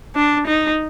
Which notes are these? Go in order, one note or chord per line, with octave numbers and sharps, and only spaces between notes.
D4
D#4